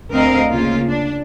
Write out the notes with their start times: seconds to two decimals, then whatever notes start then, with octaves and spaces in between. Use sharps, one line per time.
0.12 D2 C4 A#4 D#5 F5
0.51 C#3 A#3 F4
0.88 D4